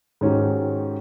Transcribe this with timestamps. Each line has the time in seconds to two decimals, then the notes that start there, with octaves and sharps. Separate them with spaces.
0.21 G#2 D#3 C#4 D#4 F#4 G4